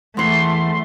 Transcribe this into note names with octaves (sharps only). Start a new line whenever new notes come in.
E2 E3 A3 C6